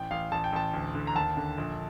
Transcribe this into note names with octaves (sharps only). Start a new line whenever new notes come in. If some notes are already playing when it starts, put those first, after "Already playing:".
Already playing: A1 G5
A1 F5
A1 A5
G5
A1 A5
D2
D3
A#5
D#2 A5
D3
A#1